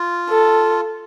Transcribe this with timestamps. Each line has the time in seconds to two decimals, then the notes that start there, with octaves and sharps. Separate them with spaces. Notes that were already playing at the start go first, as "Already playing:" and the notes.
Already playing: F4
0.29 A4